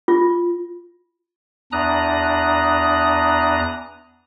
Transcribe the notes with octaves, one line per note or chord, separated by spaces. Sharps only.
F4
E2 D4 A#5 D#6 F#6